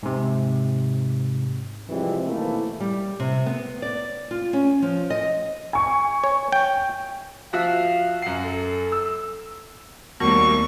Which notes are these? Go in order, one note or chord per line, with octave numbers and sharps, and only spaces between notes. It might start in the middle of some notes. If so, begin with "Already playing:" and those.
G#2 C3
C3 E3 F3 G3 G#3 C4
B2 D#3 E3 A3 A#3 E4
G3
C3
B3
D5
F4
C#4
F3
D#5
G#5 C#6
C#5
G5
F3 F#4 E5 F5
F#2 F#5 C7
A4
E6
D#2 G3 A3 B3 F#4 A#4 C#6